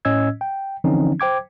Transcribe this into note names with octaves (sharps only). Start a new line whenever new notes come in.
A2 C#4 D#5 E6 G#6
G5
D3 E3 F3 C4 C#4 D#4
C5 G5 D6 G#6